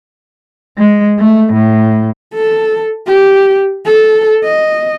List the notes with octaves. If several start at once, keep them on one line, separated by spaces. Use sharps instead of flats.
G#3
A3
A2
A4
G4
A4
D#5